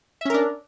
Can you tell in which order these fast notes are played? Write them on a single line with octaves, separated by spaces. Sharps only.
E5 C#4 A#4 D4